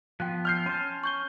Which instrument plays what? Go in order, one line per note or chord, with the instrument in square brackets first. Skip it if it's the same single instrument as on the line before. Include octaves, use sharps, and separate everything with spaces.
[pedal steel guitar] F3 B3 C6 [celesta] G5 F#6
[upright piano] F6 G6 C7
[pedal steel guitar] C#4 A5 [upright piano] C6
[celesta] C#6 G6 G7